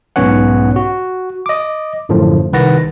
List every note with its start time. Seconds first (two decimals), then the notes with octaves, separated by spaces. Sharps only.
0.16 B1 G#2 B3 C#4 C#5 F#5
0.76 F#4
1.46 D#5 D6
2.09 F#2 A2 D3 F3
2.53 C2 D#3 B4 F#5 A6 A#6